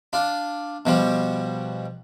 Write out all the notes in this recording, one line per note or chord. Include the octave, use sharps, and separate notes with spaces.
D4 F4
B2 F3 G3